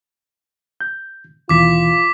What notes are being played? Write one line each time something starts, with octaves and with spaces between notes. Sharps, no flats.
G6
D#2 B2 E3 F4 D6 B6